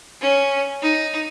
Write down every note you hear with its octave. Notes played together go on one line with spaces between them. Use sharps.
C#4
D#4